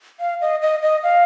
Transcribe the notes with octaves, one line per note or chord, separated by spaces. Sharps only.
F5
D#5
D#5
D#5
F5